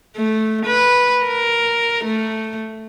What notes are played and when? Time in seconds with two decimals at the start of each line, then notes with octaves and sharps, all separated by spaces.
0.16 A3
0.66 B4
1.24 A#4
2.04 A3